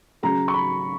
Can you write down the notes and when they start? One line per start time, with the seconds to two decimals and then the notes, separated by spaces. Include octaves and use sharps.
0.23 C#3 F#3 C#4 A#5
0.48 C#6
0.54 B5